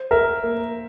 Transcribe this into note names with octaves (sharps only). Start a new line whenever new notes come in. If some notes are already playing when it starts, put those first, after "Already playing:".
Already playing: C5
A#4 E5 A#5
A#3